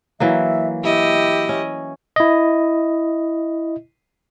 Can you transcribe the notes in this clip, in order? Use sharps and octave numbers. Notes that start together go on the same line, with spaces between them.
E3 F#3 A#3 E5
E4 G4 D#5
C#4
E4 D#5